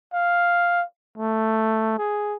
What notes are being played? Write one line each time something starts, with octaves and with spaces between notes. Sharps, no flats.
F5
A3
G#4